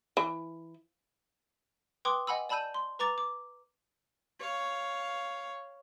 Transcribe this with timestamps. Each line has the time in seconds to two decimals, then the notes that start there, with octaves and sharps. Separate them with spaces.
0.17 E3
2.05 B4 G5 C6 D6 D#6
2.27 D#5 F#5 G#5 B5 E6
2.49 D5 A5 B5 E6 G6 D#7
2.74 C6
2.99 B4 A#5 D6 A6 F7
3.18 D6
4.39 C#5 F5